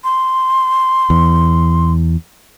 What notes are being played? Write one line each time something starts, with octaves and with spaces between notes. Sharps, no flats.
C6
E2